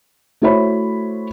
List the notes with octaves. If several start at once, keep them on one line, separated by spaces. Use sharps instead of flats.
A3 E4 F#4 C5 C#5 B5